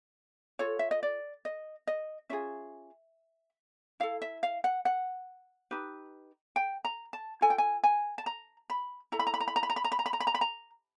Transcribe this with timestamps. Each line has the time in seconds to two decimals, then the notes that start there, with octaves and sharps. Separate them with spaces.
0.59 F4 A4 C#5
0.79 E5
0.91 D#5
1.03 D5
1.45 D#5
1.87 D#5
2.29 C#4 F4 G#4 E5
4.00 E4 A4 F5
4.22 E5
4.43 F5
4.64 F#5
4.85 F#5
5.71 D#4 G4 B4
6.56 G5
6.85 A#5
7.13 A5
7.41 F4 A4 G#5
7.50 G5
7.58 G#5
7.84 G#5
8.18 A5
8.26 A#5
8.70 B5
9.12 E4 A4 A#5
9.19 B5
9.27 A#5
9.34 B5
9.40 A#5
9.48 B5
9.56 A#5
9.63 B5
9.70 A#5
9.76 B5
9.84 A#5
9.92 B5
9.99 A#5
10.06 B5
10.13 A#5
10.20 B5
10.27 A#5
10.35 B5
10.41 A#5